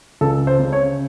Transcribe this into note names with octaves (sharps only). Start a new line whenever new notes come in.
C#2 A4
C5
C#3
C#5